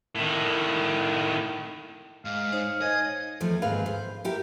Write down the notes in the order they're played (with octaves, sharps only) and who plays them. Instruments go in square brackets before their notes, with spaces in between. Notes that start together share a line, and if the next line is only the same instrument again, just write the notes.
[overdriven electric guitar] A2 D#3
[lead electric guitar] G#2 [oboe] F5
[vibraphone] D#4 C5 C#5
[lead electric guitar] D#5 [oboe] G#5
[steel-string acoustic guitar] E2 F3 A3
D#2 G#2 C4 G#4 B4 F5
C5
E4 G4 A#4